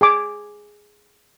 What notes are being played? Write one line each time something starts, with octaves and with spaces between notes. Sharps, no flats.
G#4 G#5 D6